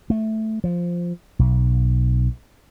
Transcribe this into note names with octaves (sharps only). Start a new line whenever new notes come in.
A3
F3
B1